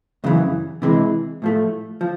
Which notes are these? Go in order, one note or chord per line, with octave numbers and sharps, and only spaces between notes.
F#2 C#3 E3
C3 E3 G#3
A2 F3 A3
F3